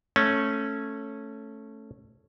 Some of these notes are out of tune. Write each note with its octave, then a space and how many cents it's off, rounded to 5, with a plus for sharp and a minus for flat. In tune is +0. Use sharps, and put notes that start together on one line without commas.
A3 +0 C#4 -10